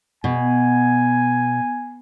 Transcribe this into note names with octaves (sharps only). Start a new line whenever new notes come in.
B2 G#5